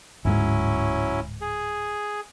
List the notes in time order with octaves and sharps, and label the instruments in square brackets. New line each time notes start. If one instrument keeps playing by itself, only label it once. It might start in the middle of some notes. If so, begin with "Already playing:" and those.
[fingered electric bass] D1 G#2 G#3 [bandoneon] F#3 C#4 E4
[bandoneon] G#4